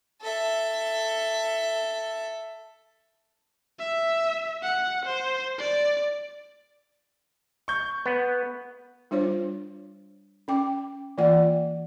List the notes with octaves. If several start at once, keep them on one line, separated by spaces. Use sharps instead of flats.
A4 E5
E5
F#5
C5
D5
C#6 G6
B3
G3 D4 F4 C5 C#5
C#4 G5 D6
E3 A#3 F4 D5 F#5